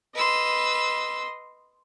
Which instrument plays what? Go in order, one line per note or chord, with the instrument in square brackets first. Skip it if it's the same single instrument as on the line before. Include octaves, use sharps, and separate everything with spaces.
[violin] B4 E6 [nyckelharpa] D#5 C6